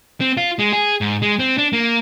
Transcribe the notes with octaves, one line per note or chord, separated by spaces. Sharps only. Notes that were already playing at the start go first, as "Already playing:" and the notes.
C4
F4
G#3
G#4
G#2
G#3
C4
D4
A#3